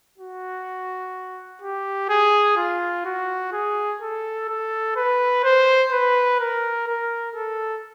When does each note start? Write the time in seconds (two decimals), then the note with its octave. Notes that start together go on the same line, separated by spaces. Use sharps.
0.18 F#4
1.62 G4
2.09 G#4
2.57 F4
3.06 F#4
3.53 G#4
4.01 A4
4.49 A4
4.96 B4
5.44 C5
5.92 B4
6.40 A#4
6.87 A#4
7.35 A4